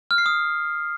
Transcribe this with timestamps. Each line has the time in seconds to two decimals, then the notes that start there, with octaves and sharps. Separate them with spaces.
0.11 F6
0.18 C7
0.26 D#6